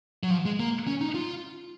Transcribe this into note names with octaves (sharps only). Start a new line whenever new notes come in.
F#3
F3
G#3
A#3
C#4
D#4
F4